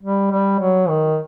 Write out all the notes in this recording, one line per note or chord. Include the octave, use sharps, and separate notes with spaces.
G3
G3
F#3
D#3